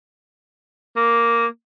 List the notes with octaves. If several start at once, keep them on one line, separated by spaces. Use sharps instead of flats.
A#3